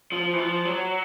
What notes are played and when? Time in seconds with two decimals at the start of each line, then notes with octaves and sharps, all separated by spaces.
0.12 F3
0.33 E3
0.38 F3
0.65 F#3